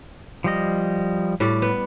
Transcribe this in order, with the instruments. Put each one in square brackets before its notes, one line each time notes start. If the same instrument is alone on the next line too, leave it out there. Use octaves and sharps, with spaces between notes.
[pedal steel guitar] F3 G3 D#5
[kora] A2 G3 D5
B3